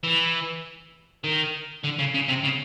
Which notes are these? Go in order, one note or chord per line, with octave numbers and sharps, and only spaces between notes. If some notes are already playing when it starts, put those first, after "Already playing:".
E3
D#3
D3
C#3
C#3
C3
C#3